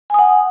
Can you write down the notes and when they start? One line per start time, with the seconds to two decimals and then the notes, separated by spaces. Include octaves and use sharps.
0.10 G#5
0.14 D#6
0.19 F#5